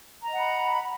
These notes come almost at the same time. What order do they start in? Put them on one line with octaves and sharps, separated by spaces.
A#5 D#5 F#5 B5